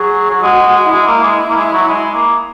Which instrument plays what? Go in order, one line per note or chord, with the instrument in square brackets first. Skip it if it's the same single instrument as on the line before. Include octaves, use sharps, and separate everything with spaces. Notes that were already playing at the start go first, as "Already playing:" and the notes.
Already playing: [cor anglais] F#3 [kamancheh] G#4
[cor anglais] F#3
[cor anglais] G#3 [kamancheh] F#4
[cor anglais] G#3
[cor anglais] G#3 [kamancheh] E4
[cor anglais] A#3
G#3
A#3
G#3
F#3
G#3
A#3